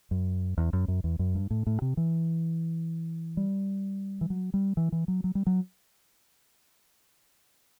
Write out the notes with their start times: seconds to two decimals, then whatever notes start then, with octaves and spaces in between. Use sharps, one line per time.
0.11 F#2
0.58 E2
0.73 F#2
0.88 F#2
1.04 E2
1.19 F#2
1.35 G2
1.51 A2
1.67 A2
1.82 C3
1.97 E3
3.37 G3
4.21 E3
4.30 F#3
4.54 G3
4.77 E3
4.92 E3
5.08 F#3
5.24 F#3
5.35 G3
5.47 F#3